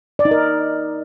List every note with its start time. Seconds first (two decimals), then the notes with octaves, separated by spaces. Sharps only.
0.19 D5
0.25 D#4
0.31 A#4